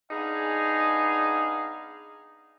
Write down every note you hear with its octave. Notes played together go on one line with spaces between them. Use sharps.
B3 D4 D#4 G#4 F5 G#5